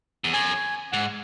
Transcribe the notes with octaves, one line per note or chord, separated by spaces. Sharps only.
E2
F#2 G#5
G#2 F#5